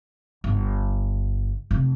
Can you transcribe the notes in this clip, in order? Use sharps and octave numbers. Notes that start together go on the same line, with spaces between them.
G1
F1